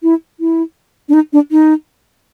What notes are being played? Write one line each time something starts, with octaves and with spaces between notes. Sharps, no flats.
E4
E4
D4
D#4
D4
D#4